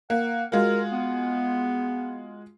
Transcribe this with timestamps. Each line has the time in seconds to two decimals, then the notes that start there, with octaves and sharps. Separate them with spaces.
0.10 A#3 F#5
0.52 G#3 F4 F#4 A#4
0.92 B3